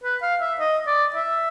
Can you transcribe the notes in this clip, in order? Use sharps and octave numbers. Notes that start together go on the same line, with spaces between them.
B4
F5
E5
D#5
D5
E5